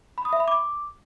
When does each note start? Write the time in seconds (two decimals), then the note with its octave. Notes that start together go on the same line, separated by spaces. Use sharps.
0.18 B5
0.25 D#6
0.33 E5
0.40 B5
0.48 D6